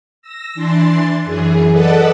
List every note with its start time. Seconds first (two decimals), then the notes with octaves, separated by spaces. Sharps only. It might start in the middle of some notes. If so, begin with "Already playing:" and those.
0.22 E6 A#6
0.54 E3 D4 C6 A6
1.24 F#2 E3 G#4
1.71 A4 B4 D5 D#5 F#5 A5